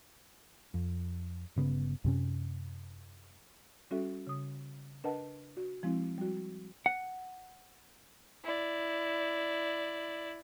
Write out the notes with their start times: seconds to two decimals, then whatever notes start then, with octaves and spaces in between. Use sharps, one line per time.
0.74 F2
1.56 G1 C#3 B3
2.04 F#2 C3 C#4
3.91 G3 C#4 F#4 A4 E5
4.27 C#3 D#6
5.04 D4 A#4 B4 D#5 F#5 A5
5.57 F#4
5.83 F3 G#3 C4 E4
6.18 G3 F#4
6.86 F#5
8.44 E4 D5